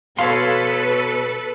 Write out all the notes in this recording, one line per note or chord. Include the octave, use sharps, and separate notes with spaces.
B2 A4 B4 C#5 F5 C6